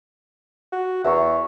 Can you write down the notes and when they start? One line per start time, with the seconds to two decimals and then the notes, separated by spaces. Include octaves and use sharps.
0.72 F#4
1.04 E2 E5 A#5 C#6